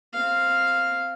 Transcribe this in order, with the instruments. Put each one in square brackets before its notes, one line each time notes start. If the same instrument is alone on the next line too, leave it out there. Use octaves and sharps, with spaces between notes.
[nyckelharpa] C4 F5